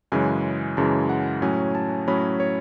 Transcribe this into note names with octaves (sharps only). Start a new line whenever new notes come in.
F#2 C#3 E3 G#3 G#5
F#2 C#3 E3 G#3 A5
F#5
A2 F#3 C#4 G#5
A5
A2 F#3 C#4 B5
C#5